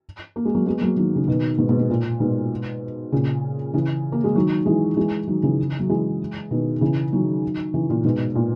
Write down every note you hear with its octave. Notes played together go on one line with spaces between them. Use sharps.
A#3
G#3
F#3 A#3
G#3 B3
F#3 A#3
D#3 F#3
C#3
B2 D#3
G#2 B2
G#2 B2
G#2
A#2
G#2 B2
A#2 C#3
C#3 E3
A#3
G#3
D#3 F#3
E3 G#3
E3 G#3
D#3 F#3
C#3 E3
F#3
E3 G#3
B2 D#3
C#3 E3
D#3 F#3
C#3 E3
A#2
G#2 B2
A#2